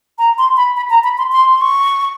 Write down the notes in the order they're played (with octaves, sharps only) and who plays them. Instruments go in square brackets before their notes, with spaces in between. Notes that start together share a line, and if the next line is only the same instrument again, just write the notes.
[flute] A#5
C6
B5
B5
A#5
B5
C6
C6
C6
C#6